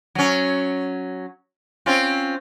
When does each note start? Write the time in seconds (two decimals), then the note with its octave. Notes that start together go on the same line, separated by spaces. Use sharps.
0.15 F#3 C#4
1.86 C4 C#4 F4